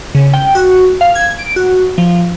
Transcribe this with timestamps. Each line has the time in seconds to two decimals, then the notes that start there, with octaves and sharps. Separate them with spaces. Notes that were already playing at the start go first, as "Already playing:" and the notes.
0.15 C#3
0.33 G5
0.55 F#4
1.01 F5
1.15 G#6
1.39 D7
1.56 F#4
1.98 F3